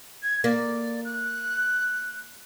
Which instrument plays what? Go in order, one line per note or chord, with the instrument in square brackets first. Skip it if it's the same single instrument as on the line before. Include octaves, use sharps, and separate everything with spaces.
[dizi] G#6
[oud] A#3 [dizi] D5
[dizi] F#6